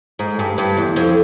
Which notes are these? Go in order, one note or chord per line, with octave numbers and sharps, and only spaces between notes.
G#2
G2
G2
E2
F2